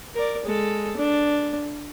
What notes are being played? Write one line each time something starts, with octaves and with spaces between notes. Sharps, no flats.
A#4 D5
G#3 A4
D4